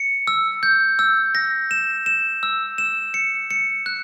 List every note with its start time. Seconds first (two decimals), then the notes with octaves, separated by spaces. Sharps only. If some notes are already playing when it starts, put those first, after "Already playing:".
Already playing: C#7
0.27 E6
0.63 G6
0.99 E6
1.35 A#6
1.71 E7
2.06 E7
2.43 E6
2.78 E7
3.14 C#7
3.50 C#7
3.86 F#6